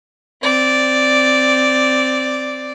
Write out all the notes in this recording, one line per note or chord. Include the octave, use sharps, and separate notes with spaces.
C4 D5